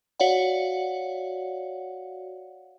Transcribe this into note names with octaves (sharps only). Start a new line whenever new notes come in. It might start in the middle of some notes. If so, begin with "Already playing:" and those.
F#4 C#5 D5 F5 F#5